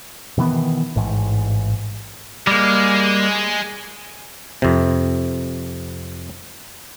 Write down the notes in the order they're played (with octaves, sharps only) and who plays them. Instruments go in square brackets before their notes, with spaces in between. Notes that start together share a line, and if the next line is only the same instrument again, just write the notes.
[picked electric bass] B2 D#3 E3 B3
A1 G#2
[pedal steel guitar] G3 A#3 [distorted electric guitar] G#3
[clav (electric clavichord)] F2 C3